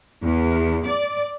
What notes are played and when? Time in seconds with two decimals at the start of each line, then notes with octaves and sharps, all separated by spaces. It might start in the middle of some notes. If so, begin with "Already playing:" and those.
0.23 E2
0.86 D5